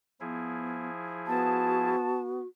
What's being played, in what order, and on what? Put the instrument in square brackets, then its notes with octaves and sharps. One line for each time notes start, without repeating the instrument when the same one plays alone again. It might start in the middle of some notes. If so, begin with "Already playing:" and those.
[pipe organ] F3 E4 G#4 [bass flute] B3
[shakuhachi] B3 [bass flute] F#4 [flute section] A5